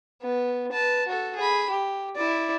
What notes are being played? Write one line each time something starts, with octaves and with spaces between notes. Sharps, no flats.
B3
B4 A5
F#4 A4
G#4 B5
G4
E4 D5